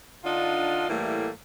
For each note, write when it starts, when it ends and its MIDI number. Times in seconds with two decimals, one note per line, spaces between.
0.24 0.87 50
0.24 0.87 62
0.24 0.87 63
0.24 0.87 65
0.89 1.29 45
0.89 1.29 52
0.89 1.29 55
0.89 1.29 57
0.89 1.29 58